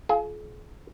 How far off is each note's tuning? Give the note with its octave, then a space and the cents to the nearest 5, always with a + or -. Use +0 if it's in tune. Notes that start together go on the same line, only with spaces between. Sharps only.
F4 +0 G#4 +40 G#5 -10